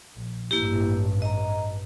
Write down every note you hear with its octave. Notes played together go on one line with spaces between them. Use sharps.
A#1
A1 G2 A#3 E4 G4
D#5 A#5